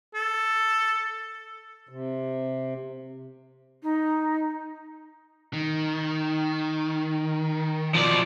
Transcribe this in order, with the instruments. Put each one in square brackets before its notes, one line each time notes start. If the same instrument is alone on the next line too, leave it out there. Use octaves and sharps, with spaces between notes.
[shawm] A4
[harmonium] C3
[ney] D#4
[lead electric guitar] D#3
[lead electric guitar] B2 E3 [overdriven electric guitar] F3 D5